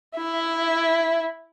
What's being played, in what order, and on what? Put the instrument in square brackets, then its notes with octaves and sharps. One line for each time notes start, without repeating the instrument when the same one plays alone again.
[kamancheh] E4 E5